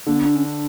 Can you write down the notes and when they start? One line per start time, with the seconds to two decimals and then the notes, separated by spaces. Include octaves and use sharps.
0.06 D3 A#3
0.16 B3
0.26 D4
0.36 C#4
0.45 D4